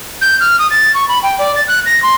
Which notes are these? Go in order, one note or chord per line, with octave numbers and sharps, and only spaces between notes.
G6
F6
D#6
A6
C#6
B5
G5
D5
A6
F#6
A#6
C6